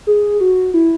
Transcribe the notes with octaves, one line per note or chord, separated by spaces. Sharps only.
G#4
F#4
E4